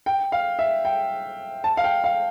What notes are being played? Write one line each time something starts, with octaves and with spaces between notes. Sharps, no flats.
G5
F5
E5
G5
A5
F5
G5
F5